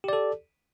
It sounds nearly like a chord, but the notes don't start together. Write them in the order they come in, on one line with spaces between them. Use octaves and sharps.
G4 D5 A4